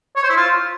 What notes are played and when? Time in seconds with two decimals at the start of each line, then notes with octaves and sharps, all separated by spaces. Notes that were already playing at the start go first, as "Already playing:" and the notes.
0.16 C#5
0.23 C5
0.30 E4
0.36 F4